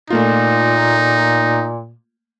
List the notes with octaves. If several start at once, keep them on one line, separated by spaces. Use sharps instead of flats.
A#2 A3 A#3 D#4 F4